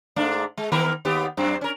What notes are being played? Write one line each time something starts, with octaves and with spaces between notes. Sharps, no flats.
G#2 A3 D4
G#3
D#3 B3 A#4
D#2 B3 G4
F#2 C4
C#4 A#4